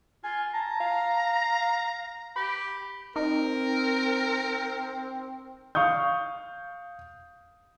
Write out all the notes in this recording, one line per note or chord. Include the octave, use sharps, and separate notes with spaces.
F4 G#5
A5 A#5
F5
G4 B5
C4 D#4 A#4
F5 C#6 D#6 G6